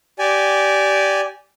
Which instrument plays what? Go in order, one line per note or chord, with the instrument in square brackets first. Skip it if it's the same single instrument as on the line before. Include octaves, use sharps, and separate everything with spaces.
[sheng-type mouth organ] G4 D5 G#5